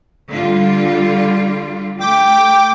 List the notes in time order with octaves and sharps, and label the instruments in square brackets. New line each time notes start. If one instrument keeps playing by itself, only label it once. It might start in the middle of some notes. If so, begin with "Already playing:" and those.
[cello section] D3 G3 F4
[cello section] A3 [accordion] G5 D6